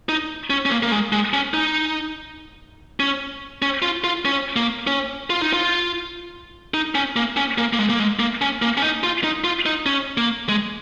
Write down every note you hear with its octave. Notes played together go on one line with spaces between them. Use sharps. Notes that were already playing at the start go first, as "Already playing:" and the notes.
D#4
C#4
C#4
A#3
A#3
G#3
G#3
C#4
D#4
C#4
C#4
F4
F4
C#4
A#3
C#4
F4
D#4
F4
D#4
C#4
A#3
C#4
A#3
A#3
G#3
A#3
G#3
A#3
C#4
A#3
C#4
D#4
F4
D#4
F4
D#4
C#4
A#3
G#3